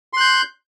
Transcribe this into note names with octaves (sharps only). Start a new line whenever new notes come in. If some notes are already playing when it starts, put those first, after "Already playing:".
C6 F#6 G6